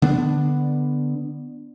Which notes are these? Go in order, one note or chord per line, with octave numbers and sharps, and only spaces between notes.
D3 B3 D4